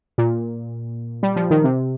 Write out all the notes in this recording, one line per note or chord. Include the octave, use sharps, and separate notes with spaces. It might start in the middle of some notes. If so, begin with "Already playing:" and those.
A#2
G3
F3
D#3
C3